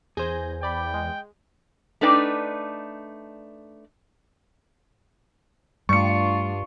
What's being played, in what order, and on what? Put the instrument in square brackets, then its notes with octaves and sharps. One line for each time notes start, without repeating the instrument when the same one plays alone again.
[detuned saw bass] E2 [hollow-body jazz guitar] G#4 C5 [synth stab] G#5 G6 A#6
[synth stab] D5 B5 [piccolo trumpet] G5
[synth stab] G#3
[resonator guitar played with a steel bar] A3 D4 D#4 B4 D5 G5
[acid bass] G2 [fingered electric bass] G3 A3 [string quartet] D4 F4 [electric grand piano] C#6 C#7